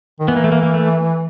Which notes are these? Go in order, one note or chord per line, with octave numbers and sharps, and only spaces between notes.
D#3
E3 B3
A#3
A3
A#3
A#3
A3